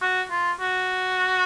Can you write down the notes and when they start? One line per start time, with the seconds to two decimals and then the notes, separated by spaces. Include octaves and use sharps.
0.01 F#4
0.31 F4
0.60 F#4